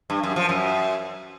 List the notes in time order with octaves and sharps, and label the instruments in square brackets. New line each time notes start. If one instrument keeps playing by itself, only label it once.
[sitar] G2
F#2
F3
F#2